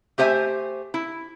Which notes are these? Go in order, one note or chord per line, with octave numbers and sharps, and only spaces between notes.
A3 G4 C5 E5 G#5
E4